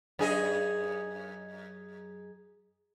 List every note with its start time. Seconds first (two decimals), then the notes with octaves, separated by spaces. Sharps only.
0.19 F#2 G#4 D#5